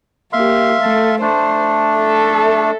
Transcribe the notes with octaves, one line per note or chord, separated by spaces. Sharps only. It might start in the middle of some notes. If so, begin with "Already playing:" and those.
A#3 G4 E5 F5 C6
A3 A4
A3 D4 C5
A4 E5